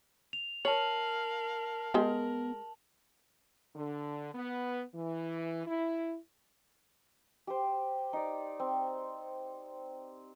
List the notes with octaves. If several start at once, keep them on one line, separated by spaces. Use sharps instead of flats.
F7
A#4 C#5 F5 A5 F#7
G#3 B3 G4 A#4 G5
D3
B3
E3
E4
G4 C5
D#4 D5
C4